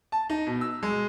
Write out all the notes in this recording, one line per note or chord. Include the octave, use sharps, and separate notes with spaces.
A5
D#4
B2
E6
G#3